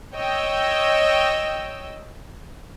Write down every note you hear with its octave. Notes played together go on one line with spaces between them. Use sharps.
C#5 D#5 G5 E6